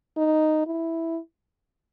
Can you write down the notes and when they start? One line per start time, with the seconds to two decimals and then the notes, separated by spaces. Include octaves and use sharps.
0.17 D#4
0.67 E4